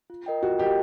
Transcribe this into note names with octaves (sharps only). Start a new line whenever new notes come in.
F4
A#4 D#5 G5
F4 F#4
G4 A#4 D#5 G5